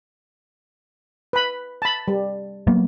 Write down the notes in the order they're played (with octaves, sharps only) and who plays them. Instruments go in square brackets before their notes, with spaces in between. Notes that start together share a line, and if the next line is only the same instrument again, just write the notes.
[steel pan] B4 B5
A5 B5
G3
[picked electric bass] F#3 A#3 B3